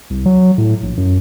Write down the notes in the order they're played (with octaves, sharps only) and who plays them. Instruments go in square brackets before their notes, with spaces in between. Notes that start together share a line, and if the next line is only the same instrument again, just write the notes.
[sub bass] C2
F#3
A2
A#1
F#2